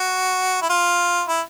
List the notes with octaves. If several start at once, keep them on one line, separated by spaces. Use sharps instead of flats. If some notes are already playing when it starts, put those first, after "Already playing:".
Already playing: F#4
E4
F4
E4